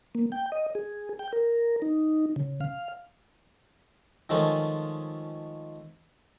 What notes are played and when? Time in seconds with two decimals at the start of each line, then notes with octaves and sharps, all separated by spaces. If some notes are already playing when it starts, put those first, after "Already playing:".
0.15 A#3
0.32 G5
0.52 D#5
0.75 G#4
1.19 G5
1.33 A#4
1.82 D#4
2.36 C#3
2.61 F5
4.30 D#3 F3 G#3 A3 C#4 F4